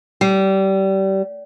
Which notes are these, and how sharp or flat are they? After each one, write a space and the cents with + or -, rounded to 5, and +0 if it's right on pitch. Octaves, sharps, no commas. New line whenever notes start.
G3 -25